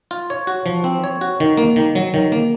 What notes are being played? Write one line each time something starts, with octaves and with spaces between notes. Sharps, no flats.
F4
C#5
F#4
F3
C4
C#5
F#4
D#3
A#3
D#3
F#3
D#3
A#3